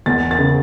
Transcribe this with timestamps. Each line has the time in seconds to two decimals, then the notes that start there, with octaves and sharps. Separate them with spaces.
0.06 E2 A6
0.31 A6
0.39 C#3